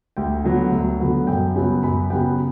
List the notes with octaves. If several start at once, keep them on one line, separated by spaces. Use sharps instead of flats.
D2 G5
D3 F#3 B3
D2
D3 F#3 B3
F#2 G5
C#3 F#3 B3
F#2 B5
C#3 F#3 B3 G5